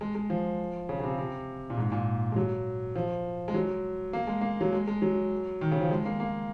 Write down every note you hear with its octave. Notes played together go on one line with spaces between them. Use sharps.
G#3
G#3
F3
C#3
C#3
C3
C3
A#2
G#2
A#2
G#3
F#3
F3
G#3
F#3
A#3
G#3
A#3
F#3
G#3
G#3
F#3
D#3
C#3
F3
G#3
A#3
A#3